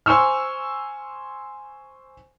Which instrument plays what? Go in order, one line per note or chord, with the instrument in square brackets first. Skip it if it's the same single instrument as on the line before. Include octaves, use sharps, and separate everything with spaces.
[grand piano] C5 G#5 C#6 E6 F6